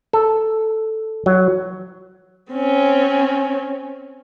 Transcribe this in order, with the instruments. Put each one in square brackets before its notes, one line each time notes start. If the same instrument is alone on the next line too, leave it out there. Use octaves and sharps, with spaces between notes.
[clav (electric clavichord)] A4
F#3
[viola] C4 C#4